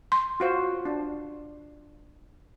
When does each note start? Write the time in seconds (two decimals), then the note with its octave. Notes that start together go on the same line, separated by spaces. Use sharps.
0.12 C6
0.40 F4 F#4 C5
0.85 D4